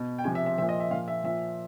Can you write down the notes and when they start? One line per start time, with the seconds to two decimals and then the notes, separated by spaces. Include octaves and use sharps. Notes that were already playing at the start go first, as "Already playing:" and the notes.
Already playing: B2
0.18 G5
0.24 C3 F3 G#5
0.35 E5
0.46 E5
0.58 F3 E5
0.62 A#2
0.69 D#5
0.80 E5
0.91 A#2 F3 F5
1.08 E5
1.24 A#2 F3 E5